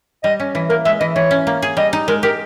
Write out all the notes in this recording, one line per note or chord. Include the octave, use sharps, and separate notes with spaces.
G3 D#5
C#4
E3
A#3 A#4
G#3 E5
E3 D#5
E3 C#5
C#4
A#3
G#4
G3 D#5
D#4
G#3 A#4
G4 A#4